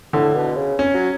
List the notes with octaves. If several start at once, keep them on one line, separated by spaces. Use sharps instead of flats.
A2 D3
B2
C#3
C#4
F#3